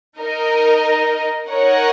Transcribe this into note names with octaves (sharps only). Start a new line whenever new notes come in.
D#4 A#4 D#5
D#4 A#4 C#5 F#5